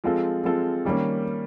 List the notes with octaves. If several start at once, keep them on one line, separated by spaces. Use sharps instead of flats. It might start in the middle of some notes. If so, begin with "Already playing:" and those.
F3 G#3 C4 F4 A4
F3 G#3 C4 F4 A4
D#3 G3 A#3 C#4